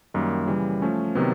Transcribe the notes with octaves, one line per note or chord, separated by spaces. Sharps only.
F#2 D#3 G3 A#3
C#3 E3 G3
F3 A3 C#4
C3 D#3 F#3 B3